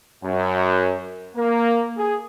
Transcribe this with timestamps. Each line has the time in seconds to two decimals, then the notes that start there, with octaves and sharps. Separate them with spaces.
0.24 F#2
1.36 A#3
1.97 G#4